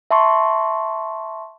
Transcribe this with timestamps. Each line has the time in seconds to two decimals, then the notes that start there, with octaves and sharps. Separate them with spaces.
0.11 E5 A5 C6 C#6